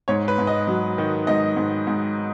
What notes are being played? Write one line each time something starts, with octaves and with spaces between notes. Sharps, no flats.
G#2 C#5
B4
G#2
D#5
F#3
D#3
G#2 D#5
G#2
G#2